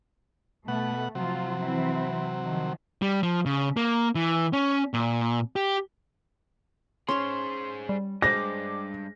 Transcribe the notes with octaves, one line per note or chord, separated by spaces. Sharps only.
B2 A3 F#5
C3 F3 F#3 F4
E3 C4 E4
D#3 F3
G3
F3
C#3
A#3
E3
C#4
A#2
G4
C#4 G#4 C5 C#5 C6
G3
G2 G#3 C5 D6 A#6